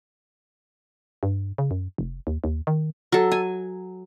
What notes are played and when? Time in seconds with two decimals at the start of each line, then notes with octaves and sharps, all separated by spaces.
1.23 G2
1.58 C#3
1.71 F#2
1.98 F1
2.27 D#2
2.44 D#2
2.67 D#3
3.12 F#3 A4
3.32 G#5